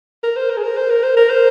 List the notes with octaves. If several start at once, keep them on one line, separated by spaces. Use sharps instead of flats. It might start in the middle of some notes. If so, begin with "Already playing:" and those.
A#4
C5
A#4
G#4
A#4
C5
A#4
C5
A#4
C5